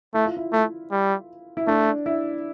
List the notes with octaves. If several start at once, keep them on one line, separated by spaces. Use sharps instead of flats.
A3 E4
F4
E4
A3
G3
E4
A3 D4
E4